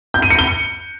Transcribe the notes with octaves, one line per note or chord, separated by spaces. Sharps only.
G6
D#7
C#7
G7